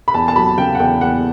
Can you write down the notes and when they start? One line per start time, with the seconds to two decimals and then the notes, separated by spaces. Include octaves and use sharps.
0.08 B5
0.14 E2 A5
0.28 A5
0.36 F#3 B5
0.58 C#3 G5
0.75 F#5
0.79 E2 G5
1.01 E2 F#5